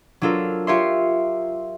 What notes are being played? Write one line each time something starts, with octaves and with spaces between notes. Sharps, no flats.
F#3 D4 F4 A4 A#4
F4 G4 A#4 C#5 E5 C6